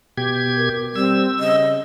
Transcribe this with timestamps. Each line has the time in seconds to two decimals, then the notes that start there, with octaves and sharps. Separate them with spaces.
0.17 B2 G4 G#6
0.58 A#4
0.96 G3 C4 E6
1.40 C#3 D#5